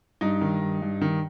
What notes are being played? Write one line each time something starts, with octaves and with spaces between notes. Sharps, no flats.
G2 D#4
D#3
G2
G2
D#3